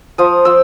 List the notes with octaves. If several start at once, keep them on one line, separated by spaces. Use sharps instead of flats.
F3 D#6
F3 E6